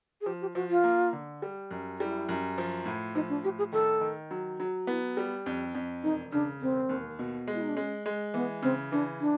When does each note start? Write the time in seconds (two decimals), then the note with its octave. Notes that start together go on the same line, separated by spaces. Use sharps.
0.21 G#4
0.26 F3 G4
0.41 G4
0.55 F3 F#4
0.70 F4
0.84 A#3
1.13 D3
1.42 G3
1.71 F#2
2.00 G3 E4
2.29 F#2
2.58 F3
2.86 A2
3.15 F3 D#4
3.29 D4
3.44 A2 G4
3.58 G#4
3.72 D#3 A4
4.01 D#3
4.31 F#3
4.60 F#3
4.87 B3 E4
5.17 G3
5.46 F2
5.75 F2
6.03 E1 D#4
6.32 C#3 D4
6.61 E1 C4
6.89 D#2
7.19 B2
7.47 G#3
7.55 E4
7.62 D#4
7.69 D4
7.76 G#3 C#4
8.06 G#3
8.34 E3 B3
8.62 C#3 C4
8.91 E3 D4
9.20 D4